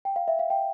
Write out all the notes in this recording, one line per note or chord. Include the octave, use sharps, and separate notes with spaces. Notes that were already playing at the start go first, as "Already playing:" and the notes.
G5
F5
E5
F5
G5